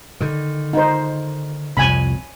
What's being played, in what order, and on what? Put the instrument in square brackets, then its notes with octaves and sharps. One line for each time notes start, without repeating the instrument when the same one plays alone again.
[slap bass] D3 D#3
[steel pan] D#4 C5
[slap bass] C2 F2 [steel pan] G#5 B5